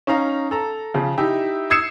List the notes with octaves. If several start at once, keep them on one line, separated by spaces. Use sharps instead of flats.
C#4 D#4 F5 A#5
A4 A#5
C#3 F3
D#4 E4 G4 E5
D#6 E6 G#6 C7 C#7 E7